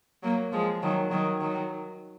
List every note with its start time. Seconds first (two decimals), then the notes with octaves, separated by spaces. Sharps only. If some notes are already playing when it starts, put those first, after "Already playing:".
0.23 F#3 A#3
0.52 F3 G#3
0.82 D#3 F#3
1.11 D#3 F#3
1.41 D#3 F#3